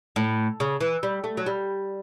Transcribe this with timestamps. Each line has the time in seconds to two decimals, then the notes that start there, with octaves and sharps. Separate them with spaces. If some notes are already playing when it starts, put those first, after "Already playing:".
0.16 A2
0.60 C#3
0.81 E3
1.03 G3
1.24 A3
1.37 F#3
1.46 G3